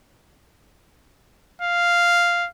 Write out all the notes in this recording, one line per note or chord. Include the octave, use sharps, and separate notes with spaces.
F5